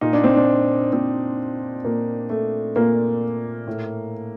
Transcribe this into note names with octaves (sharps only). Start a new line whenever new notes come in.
A#2 D#4
D4
C4
D4
A#2 C4
A#2 A#3
A3
A#2 A#3
A2